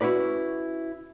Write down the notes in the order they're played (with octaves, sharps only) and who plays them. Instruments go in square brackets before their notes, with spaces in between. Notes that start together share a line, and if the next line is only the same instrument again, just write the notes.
[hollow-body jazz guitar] C#4 E4 F#4 B4 D5